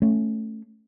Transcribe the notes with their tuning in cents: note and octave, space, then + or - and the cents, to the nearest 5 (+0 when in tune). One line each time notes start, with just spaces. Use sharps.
A3 +0 C#4 +0